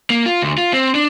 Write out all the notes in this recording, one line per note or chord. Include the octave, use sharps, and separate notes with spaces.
A#3
F4
D2
F4
C4
D4